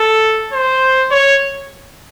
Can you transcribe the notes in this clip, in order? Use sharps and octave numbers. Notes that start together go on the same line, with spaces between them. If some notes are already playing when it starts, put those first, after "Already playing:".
Already playing: A4
C5
C#5